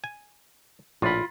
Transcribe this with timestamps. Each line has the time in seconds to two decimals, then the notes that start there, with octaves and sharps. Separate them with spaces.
0.04 G#5
1.02 A#1 A2 F4 B5